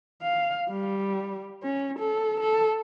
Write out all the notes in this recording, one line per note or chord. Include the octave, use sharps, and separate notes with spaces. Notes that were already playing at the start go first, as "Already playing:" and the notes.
F5
G3
C#4
A4
A4